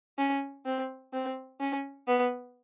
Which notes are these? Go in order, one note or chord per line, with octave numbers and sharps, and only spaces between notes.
C#4
C4
C4
C#4
B3